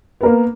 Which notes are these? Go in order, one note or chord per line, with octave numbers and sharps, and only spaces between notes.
A#3 B3 A#4